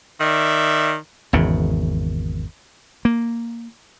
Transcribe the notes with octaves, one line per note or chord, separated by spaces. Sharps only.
D#3 D5 E5
G#1 E2 C#3
A#3